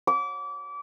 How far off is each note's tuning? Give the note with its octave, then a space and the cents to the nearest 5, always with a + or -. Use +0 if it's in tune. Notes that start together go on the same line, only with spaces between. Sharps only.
D6 -30